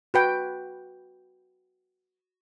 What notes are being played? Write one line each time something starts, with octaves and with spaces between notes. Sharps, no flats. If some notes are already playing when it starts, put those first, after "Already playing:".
F#4 B4 G5